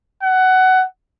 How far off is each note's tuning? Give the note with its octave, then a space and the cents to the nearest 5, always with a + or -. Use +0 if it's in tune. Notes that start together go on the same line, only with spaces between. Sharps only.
F#5 +15